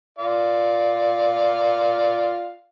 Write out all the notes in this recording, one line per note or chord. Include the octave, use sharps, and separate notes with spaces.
F4 D5 F5